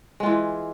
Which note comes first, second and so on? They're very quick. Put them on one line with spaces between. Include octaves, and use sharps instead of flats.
G#3 F4 E3